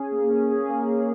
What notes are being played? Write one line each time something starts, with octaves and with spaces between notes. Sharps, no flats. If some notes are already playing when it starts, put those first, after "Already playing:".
Already playing: C#4 G#4
A#3
C#4
G#4
A#3
A#3